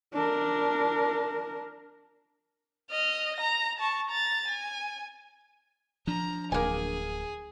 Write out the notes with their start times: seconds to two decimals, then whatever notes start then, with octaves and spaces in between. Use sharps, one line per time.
0.14 D4 A#4
2.90 D#5 F6
3.37 A#5 A#6
3.79 A5 C#6
4.10 A#5 A6
4.48 G#5
6.07 F3 D4 A#5
6.52 D1 A#3 G#4 G#5